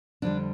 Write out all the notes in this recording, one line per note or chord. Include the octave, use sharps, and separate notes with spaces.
F2 D3 G3 D4